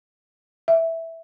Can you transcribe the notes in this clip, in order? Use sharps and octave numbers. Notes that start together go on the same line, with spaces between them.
E5